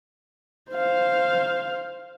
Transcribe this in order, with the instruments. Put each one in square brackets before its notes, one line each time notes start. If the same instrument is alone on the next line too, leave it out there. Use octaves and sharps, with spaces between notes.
[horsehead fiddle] C5 F5